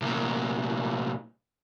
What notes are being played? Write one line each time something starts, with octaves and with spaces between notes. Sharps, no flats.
C2 A#2